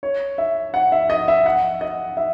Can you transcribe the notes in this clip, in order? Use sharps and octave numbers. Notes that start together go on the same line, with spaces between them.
C#5
E5
F#5
E5
D#5
E5
F#5
D#5
E5